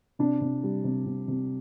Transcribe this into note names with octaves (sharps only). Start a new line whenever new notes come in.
C3 D4
C3
G3
C3
C3
C3